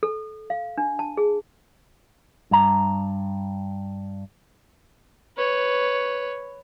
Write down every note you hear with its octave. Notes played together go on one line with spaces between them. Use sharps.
A4
F5
D4
A5
G#4
G2 A#5
B4 C#5